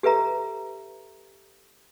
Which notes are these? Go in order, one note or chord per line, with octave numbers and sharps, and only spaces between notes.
G4 A4 B4 E5 A#5